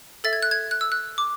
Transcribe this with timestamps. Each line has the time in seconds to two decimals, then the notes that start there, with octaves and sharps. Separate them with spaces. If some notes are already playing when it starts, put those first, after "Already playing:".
0.24 A4 E5 A6
0.33 G#6
0.42 F#6
0.51 G#6
0.71 F#6
0.81 E6
0.92 F#6
1.18 D6